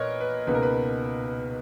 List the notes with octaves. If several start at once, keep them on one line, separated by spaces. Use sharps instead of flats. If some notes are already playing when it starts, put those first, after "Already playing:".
Already playing: A#2 B3 A#4 B4 C#5 D#5
B4
C#2 B2 A#3 D#4 B4
A#4
B4